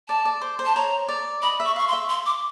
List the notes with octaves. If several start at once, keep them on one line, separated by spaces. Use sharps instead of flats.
D5 A5
D5
C5
C5
A5
C#5 A#5
D5
D#5 B5
E5
C#6
F5 C#6
C6
E5
C6
D6